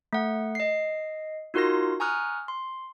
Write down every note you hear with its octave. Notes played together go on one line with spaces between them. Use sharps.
A3 F#5
D#5 C7
D#4 F4 F#4 A#4 C6 A#6
G#5 A#5 C#6 D#6 F6 F#6
C6